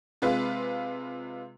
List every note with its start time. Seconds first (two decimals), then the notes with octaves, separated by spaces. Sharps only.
0.22 C3 G#3 F4 B4